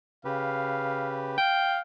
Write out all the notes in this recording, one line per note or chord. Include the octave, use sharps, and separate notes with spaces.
C#3 G4 B4 F5
F5 G5